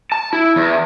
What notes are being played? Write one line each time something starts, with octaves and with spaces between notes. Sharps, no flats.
A5
E4
E2